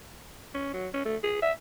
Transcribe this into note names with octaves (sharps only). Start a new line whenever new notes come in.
C#4
F#3
C#4
A3
G#4
E5